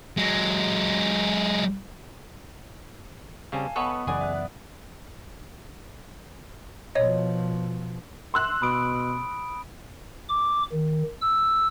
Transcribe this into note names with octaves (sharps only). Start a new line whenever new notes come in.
F#3 G#3
C#3 G3 C4 F5 G#5 A5
B3 A4 B4 C#5 D#5 B5 C#6
F#2 C#3 E3 B3 G#4 B4 D5 G#5
E5 F#6
B2 F3 C#5 D#5
C6 E6 F#6
B2 B5 D#6 D7
D6
D#3
E6